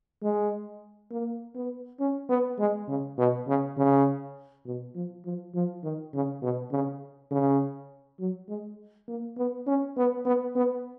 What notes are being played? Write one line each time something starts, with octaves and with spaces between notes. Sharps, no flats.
G#3
A#3
B3
C#4
B3
G#3
C#3
B2
C#3
C#3
B2
F3
F3
F3
D#3
C#3
B2
C#3
C#3
F#3
G#3
A#3
B3
C#4
B3
B3
B3